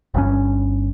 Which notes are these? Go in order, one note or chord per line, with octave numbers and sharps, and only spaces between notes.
G1 G2 D3 C#4